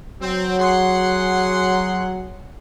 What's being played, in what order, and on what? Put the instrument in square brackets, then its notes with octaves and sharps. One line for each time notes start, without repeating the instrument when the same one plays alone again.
[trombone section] F#3 [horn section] C4
[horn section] G#4 F#5 C6